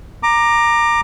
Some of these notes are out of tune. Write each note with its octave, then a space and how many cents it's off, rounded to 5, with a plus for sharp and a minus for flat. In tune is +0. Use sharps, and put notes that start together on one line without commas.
A#5 +0 D6 +20